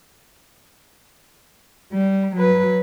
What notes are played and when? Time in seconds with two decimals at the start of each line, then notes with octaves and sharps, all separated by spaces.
1.93 G3
2.36 F#3 B4